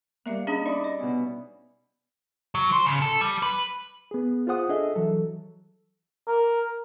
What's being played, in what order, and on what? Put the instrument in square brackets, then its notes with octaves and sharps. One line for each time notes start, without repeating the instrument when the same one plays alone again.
[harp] G3 A#3 [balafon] A#4 E5 F5
[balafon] C#4 D4 G#4 [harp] D#5 B5 D#6
[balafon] D#4 [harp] D5 E5 D#6
[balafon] D#5
[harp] B2 C#4
[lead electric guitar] F#3
C5
C#3
A4
G3
B4
[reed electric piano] B3 G#4
F4 G#4 C5 F#5 D#6
D4 G#4 A4 D#5 E5
E3 F#3 A4
[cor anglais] A#4